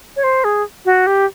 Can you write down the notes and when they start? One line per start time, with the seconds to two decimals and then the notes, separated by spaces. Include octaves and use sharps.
0.16 C#5
0.24 C5
0.44 G#4
0.85 F#4
1.07 G4